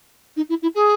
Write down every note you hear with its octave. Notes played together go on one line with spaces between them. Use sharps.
D#4
E4
E4
G#4